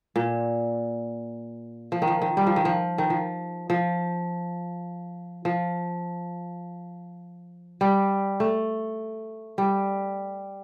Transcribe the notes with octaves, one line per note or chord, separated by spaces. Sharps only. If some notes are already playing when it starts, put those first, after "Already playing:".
A#2
F3
D#3
F3
D#3
G3
F3
D#3
F3
D#3
F3
F3
F3
G3
A3
G3